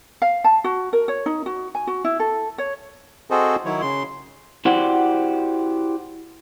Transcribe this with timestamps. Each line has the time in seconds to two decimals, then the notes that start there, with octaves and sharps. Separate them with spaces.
0.22 F5
0.44 A5
0.64 F#4
0.93 A#4
1.08 C#5
1.26 D#4
1.46 F#4
1.75 G#5
1.87 F#4
2.04 E4
2.19 A4
2.58 C#5
3.31 C4 F#4 G#4 A4 C5 D#5
3.65 D#3 F#3 E4 C#5
3.82 C#3 C6
4.65 E4 F#4 G4 C5 D5 F#5